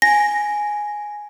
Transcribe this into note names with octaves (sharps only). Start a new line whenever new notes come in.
G#5 A#6